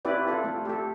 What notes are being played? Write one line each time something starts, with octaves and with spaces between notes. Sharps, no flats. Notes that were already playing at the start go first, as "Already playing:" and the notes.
C4 E4 G4 B4 D5
F4 A4
A3
G4 A4